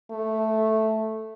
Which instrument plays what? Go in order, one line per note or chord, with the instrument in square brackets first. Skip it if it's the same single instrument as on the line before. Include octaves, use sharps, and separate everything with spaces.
[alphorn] A3